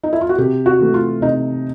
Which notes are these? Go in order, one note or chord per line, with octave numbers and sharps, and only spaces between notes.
D#4
E4
F4
F#4
C3 G4
F#4
E3 A3
F4
C3 D#4